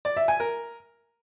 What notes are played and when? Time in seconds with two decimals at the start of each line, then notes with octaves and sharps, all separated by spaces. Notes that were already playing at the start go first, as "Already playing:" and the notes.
0.05 D5
0.17 E5
0.28 G#5
0.40 A#4